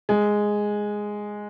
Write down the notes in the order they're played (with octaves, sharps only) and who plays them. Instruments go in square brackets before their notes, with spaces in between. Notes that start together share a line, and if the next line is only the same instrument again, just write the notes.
[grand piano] G#3